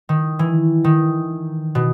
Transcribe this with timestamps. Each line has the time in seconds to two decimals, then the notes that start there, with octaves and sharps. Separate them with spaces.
0.09 D#3
0.39 E3
0.84 D#3
1.75 B2